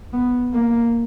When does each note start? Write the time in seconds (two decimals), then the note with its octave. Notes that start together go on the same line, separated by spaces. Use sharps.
0.13 B3
0.54 A#3